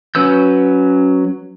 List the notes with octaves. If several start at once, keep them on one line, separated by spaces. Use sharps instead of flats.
F#3 C#4 B4 E6 G6